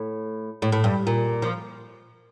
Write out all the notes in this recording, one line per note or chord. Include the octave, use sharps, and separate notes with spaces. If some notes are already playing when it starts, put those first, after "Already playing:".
Already playing: A2
A2
A2
G2
A#2
F3